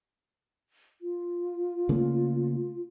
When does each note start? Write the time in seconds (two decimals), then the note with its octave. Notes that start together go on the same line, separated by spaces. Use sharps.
1.01 F4
1.89 C#3 A3 A#3